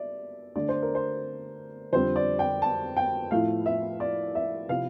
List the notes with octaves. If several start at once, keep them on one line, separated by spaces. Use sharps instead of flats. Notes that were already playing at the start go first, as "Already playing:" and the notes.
Already playing: D5 E5
D3 A3 D4 D5
C5
A#4
C5
F2 D3 G3 C4 C5
D5
G5
A5
G5
A2 F3 A3 E4 F5
E5
D5
E5
C3 F3 C4 E4 F5